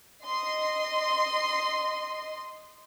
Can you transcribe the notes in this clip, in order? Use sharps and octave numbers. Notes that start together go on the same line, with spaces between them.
D#5 C6